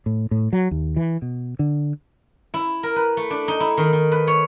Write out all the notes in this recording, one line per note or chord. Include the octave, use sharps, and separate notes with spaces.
A2
A2
F#3
D#2
E3
B2
D3
E4
A#4
B4
A3
D4
D#4
E4
D#3
D#3
B4
C#5